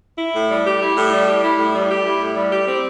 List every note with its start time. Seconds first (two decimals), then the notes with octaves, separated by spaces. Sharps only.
0.18 E4
0.34 A2
0.49 G3
0.65 G4
0.80 E4
0.96 A2
1.11 G3
1.27 G4
1.42 E4
1.57 A2
1.74 G3
1.90 G4
2.05 E4
2.20 A2
2.35 G3
2.51 G4
2.67 C4